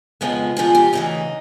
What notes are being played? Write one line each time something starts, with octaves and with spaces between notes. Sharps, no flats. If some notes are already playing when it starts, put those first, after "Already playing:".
F2 C#3 F3 G#3 B3
F2 C#3 F3 G#3 B3 G#4
G4
D2 C#3 E3 D#4